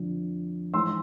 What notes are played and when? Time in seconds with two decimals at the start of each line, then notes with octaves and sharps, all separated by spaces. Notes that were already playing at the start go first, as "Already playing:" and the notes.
Already playing: F2 D3 F3
0.74 G#2 E3 C6 E6